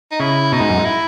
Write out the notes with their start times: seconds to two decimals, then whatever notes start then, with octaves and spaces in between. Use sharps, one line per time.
0.11 D#4
0.20 C#3 E4
0.52 B2 D#4
0.60 G#2
0.69 F#2
0.78 G#2
0.85 E4